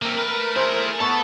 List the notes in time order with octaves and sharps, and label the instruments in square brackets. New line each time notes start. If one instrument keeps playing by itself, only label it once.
[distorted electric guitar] A3 [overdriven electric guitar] A#3 C4 [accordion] A#4
[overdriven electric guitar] B4
[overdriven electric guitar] E4 G#4 [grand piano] C5
[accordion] B3 [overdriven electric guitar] A4 [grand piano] A5 C#6